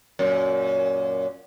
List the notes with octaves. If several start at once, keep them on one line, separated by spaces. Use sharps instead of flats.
F#2 A#2